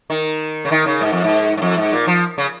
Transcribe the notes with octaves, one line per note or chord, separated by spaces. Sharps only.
D#3
C#3
D#3
C#3
G#2
F2
G#2
G#2
F2
G#2
A#2
F3
C#3